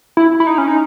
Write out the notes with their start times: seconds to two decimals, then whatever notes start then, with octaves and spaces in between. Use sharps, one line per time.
0.17 E4
0.40 E4
0.47 D#4
0.58 C#4
0.68 D#4